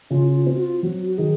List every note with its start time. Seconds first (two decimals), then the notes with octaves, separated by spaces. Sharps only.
0.10 C#3 F4
0.29 F4
0.46 C4 F4
0.55 F#4
0.62 F4
0.83 F#3 F#4
1.06 F#4
1.18 D#3 G#4